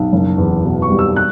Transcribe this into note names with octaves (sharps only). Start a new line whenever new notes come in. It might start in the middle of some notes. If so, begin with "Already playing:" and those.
Already playing: B1
F#1
E2
B2
C#6
G3
E6
F#6